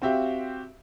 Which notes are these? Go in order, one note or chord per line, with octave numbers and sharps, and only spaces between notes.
C4 F#4 G4 E5 F5